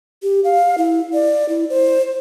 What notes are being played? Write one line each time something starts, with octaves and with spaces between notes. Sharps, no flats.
G4
F5
E4
D5
E4
C5